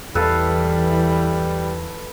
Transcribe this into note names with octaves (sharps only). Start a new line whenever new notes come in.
E2 E3 G3 A4 B4 F5